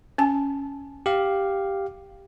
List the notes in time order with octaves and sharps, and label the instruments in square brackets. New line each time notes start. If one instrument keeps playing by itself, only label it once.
[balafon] C#4 G#5 A5
[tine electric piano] G4 F5